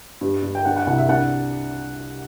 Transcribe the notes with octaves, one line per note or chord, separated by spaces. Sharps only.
G2
G2
G5
D4 F#5
F#5
C2 F#5
E5
D4 F#5